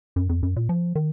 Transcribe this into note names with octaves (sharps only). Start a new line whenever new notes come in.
F#2
F2
F#2
A#2
F3
D#3